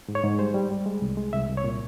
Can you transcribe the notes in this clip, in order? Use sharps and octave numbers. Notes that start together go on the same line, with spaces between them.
G#2
C#5
G#2
G3 C5
G3
G3
G#3
C2
G#3
C2 E5
C2
C#5
A#2